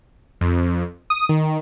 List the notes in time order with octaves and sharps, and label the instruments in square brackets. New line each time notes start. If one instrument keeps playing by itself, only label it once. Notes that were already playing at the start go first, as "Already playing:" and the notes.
[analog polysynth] F2
D#6
D#3